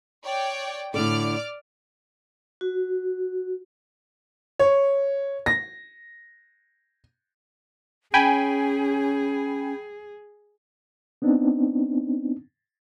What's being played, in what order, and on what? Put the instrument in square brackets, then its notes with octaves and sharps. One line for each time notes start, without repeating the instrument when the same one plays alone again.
[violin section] C#5 D5 G5
[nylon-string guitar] A2 D3 A4 [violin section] D5 D6 F6
[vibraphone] F#4
[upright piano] C#5
A#6
[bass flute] C#4 [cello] G#4 [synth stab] G5 G#5 B5
[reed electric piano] B3 C4 D4 D#4